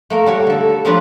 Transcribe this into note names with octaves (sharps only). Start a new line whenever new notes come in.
A3 A#3 A#4
G3 F#4 C#5
D3 A4
F3 A#3 C#4 D4 F4 B4